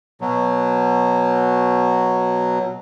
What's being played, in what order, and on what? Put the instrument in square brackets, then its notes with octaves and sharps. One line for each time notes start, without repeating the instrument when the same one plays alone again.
[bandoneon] B2 F#3